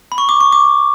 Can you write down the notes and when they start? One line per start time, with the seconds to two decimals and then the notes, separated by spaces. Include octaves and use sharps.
0.12 B5
0.18 C#6
0.29 D6
0.40 C#6
0.52 D6